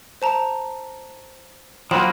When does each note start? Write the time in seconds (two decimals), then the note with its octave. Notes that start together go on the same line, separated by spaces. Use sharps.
0.22 C5 A5 A#5
1.91 F3 F#3 A#3 G5 B5 E7